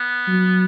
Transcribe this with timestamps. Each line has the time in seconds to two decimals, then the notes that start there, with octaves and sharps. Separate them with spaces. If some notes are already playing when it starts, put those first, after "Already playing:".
Already playing: B3
0.28 F#3